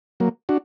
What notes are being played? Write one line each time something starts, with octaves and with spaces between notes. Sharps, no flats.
F#3 A#3
D4 F#4